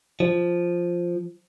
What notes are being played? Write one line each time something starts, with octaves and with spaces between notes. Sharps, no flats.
F3